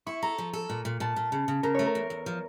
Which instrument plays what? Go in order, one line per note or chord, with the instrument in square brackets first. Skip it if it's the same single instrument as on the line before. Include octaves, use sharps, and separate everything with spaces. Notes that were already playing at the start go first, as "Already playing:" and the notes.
[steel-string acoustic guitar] E4 [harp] C#6
[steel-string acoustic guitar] A4 [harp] A#5
[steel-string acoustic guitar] F3
A4
A#2
A#2
[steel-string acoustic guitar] A#2 [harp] A5
[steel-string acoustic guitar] A#2
C#3
C#3
[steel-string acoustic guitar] C#3 [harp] A#4
[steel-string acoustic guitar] A3 [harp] C#5
[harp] A#4
[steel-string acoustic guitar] E2
E2
F3